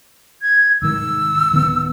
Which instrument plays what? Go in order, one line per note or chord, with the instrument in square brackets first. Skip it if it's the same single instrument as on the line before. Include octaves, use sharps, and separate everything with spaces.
[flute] G#6
[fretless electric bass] C2 G#2 D#3 [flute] E6
[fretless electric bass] D1 D#3 B3